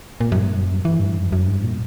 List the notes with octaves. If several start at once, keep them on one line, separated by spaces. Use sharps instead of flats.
A#2
F#2
G2
F#2
E3
G2
F#2
F#2
G2
A#2